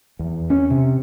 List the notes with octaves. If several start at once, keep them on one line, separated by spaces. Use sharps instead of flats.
E2
C#4
C3